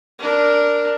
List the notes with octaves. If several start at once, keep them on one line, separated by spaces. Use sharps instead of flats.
D4 A#4